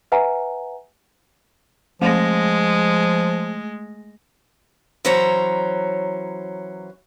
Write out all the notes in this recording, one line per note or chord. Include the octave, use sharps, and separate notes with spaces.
B4 E5 F#5 G#5 A#5
F3 G#3 A3 A#6
E3 F#3 C#4 C5 C#5 A#5